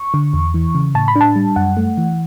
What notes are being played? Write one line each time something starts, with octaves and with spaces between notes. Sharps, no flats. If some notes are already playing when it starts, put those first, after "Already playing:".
Already playing: C#6
D3
E2
E3
C#3
A2 A5
B5
D4
A5
G3
F#2 F#5
A3
E3